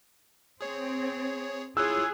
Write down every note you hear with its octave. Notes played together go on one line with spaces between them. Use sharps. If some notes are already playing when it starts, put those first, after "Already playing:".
C4 G#4 C#5
E4 F4 G#4 C#5 E6 F#6